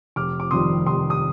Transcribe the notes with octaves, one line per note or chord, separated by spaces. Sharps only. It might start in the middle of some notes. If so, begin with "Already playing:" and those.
F1 D6 F6
D6
F2 D#3 G3 C6 D#6
F1 C6 D#6
D#6